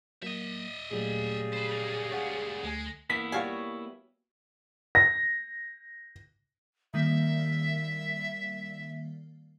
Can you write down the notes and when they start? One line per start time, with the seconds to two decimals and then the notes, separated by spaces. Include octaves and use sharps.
0.23 F#3 A#3 D#5 E5
0.91 A#2 C#3 F#3 G3 A3 G#4
1.53 B4 C5
1.72 B2 A#3
2.11 C#2 A#2 C#5 F5 F#5
2.64 D2 G#3 A3 G#5
3.10 A#3 B3 E4 B6
3.32 G3 F4 F#4 C#5 F5 G#5
4.95 A#6
6.94 D#3 G3 A#3 E5